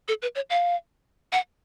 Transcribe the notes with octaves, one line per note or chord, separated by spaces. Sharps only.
A4
B4
C#5
F5
F#5